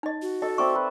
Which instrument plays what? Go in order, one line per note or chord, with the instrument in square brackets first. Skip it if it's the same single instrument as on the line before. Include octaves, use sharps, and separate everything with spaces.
[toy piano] D#4 D#5
[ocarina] F#4
[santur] A4 [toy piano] D#5
[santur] C4 D5 E5 [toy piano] C#6
[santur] B4